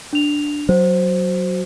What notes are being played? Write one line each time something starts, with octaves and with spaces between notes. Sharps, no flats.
D4 F7
F#3 C5